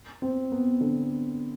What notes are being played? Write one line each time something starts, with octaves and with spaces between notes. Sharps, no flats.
C4
B3
D3